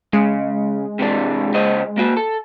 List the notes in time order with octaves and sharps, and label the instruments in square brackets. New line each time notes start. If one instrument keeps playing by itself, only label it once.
[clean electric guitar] C#3 [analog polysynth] G#3
[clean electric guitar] C3 E3 D4
C#3 C5 D#5
A#3 F#4
A4